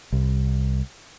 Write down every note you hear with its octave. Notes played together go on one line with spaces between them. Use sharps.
C2